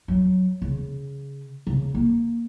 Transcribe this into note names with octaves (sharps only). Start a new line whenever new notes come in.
F#3
C#3
C#3
A#3